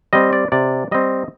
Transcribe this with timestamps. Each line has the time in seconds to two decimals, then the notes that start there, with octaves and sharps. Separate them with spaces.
0.13 G3 C4 D#5
0.33 D5
0.52 C3 D5
0.91 G3 C4 D#5